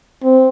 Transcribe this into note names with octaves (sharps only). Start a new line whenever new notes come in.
C4